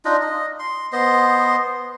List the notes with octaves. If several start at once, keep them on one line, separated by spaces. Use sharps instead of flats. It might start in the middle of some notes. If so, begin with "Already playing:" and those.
D4 D#4 F4 D#5
D#5
C6
B3 C5 D#5 C6